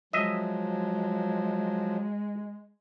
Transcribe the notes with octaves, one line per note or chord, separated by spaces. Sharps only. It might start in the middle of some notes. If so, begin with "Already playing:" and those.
F3 F#3 G#3 D#5 E5